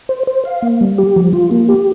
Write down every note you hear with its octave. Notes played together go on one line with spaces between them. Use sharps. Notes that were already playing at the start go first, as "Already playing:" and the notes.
C5
C5
F5
A#3
G3
G4
F3
F4
A#3
G4